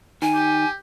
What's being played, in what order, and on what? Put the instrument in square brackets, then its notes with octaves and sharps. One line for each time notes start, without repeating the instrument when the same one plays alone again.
[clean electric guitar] D#3 [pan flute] G#5
[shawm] G4